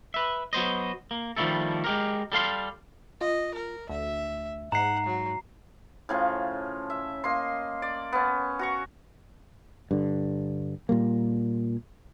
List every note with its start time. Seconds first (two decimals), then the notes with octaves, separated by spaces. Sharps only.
0.14 B4 E5
0.53 F#3 B3 C5 D#5
1.11 A#3
1.36 D#3 F3 G3 A3 E4 A4
1.84 G#3 G4 A#4
2.32 G3 A4 F5 C6
3.21 F4 D#5
3.54 A#4
3.89 D2 E5
4.72 G#2 F#5 A#5 C7
5.06 F#3
6.09 A2 C#3 F3
6.90 E5
7.24 A#3 D#5 C6
7.82 D5
8.13 B3 C#4
8.59 F#4 A#5 C#6
9.91 G2 D3
10.89 A#2 G3 A#3